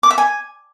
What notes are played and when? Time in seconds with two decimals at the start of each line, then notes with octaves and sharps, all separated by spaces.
0.03 D6
0.10 E5
0.18 G#5